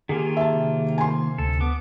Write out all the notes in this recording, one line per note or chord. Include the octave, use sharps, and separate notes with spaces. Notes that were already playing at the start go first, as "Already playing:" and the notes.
D#3 A#3 F4 G4 G#4 G#5
E5 A5
C3
G#5 C6
D2 A4
B3 D6